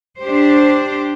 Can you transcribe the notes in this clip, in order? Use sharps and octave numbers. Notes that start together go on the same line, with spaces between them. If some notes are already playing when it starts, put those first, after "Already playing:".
D4 G4 C5